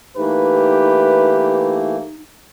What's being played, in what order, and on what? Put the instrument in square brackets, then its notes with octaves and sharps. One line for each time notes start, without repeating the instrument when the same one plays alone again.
[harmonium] E3 A3 A#3 [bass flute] D#4 [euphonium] G4 [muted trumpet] B4